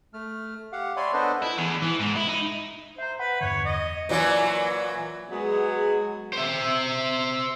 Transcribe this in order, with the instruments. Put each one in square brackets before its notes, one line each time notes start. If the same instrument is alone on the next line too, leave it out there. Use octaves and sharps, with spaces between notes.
[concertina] A3 F6
G4 F5 F#5
C#5 D5 E5 G#5 B5 C6
B3 D4 A4 B4 C5 D#5
[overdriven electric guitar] E4
E2
E3
G#2
E4
D#4
[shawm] C5 [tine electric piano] E5 A#5
[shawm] B4 [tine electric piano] F#5 B5
[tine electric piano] E2 G2 D3 [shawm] C#5
[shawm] D#5
[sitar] A#2 E3 F#3
[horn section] F#3 G#3 B3 G#4
[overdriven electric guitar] C5 E5